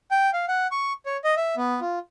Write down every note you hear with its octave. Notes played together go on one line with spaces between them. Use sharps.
G5
F5
F#5
C#6
C#5
D#5
E5
B3
F4